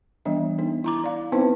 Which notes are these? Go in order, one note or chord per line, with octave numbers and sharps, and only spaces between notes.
E3 G3 B3 D4 D#5
B3 D#4
E4 A#5 D6
D5 F5
B3 C4 D#4 E4 B4 C5